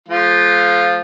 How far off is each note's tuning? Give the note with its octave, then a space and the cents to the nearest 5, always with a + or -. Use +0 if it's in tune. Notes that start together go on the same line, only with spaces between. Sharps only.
F3 +0 A3 -40 F4 +0